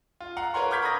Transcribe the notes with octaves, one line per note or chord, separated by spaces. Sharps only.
F4
F5 F#5 A#5
A#4 B4 C#5 F#5 A#5 C6
C#6 D6 F6 G6 G#6 B6
A#5 B5 D6 D#6 G#6 A#6